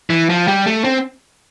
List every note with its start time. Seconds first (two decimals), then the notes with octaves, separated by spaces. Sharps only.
0.10 E3
0.30 F3
0.48 G3
0.66 A3
0.84 C4